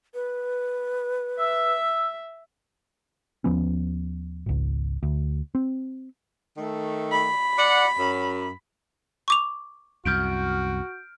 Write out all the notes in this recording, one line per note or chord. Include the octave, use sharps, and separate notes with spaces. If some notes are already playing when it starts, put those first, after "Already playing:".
B4
E5 E6
D#2 F3 B3 C#4
G#1 C#2
D2
C4
D#3 A3
B5
D5 F#5
F#2
C#6 D6 F7
C2 F#2 F#4 F6 G6 D7